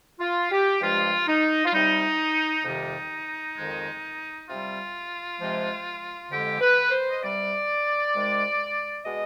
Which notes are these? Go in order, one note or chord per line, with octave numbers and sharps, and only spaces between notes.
F4
G4
G2 F3 G#3 F4
D#4
F4
C3 G3 D#4
F2 C3 D#3 G3 D#4
F2 D#3 G#3
C3 G3 F4
C3 F3 G#3
F2 D3 G#3 G4
B4
C5
D#5
C3 G3 D5
C3 D#3 G#3
B2 G#3 D#5